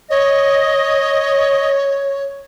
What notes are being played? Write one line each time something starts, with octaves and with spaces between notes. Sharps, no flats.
C#5 D#5